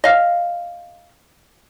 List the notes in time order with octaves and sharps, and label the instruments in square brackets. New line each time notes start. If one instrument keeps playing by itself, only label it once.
[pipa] D#5 F5